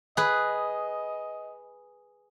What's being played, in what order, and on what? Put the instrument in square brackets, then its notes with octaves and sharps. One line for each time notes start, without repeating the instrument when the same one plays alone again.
[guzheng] G#4 B4 [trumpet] D#5